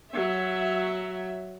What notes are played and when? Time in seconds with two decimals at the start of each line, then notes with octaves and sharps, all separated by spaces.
0.13 F#3 E5